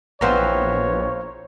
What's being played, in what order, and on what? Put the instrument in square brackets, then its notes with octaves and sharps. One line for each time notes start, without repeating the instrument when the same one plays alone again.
[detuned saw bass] A#1 [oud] E3 B3 C4 [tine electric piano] C5 F5 A#5 [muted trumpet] C#5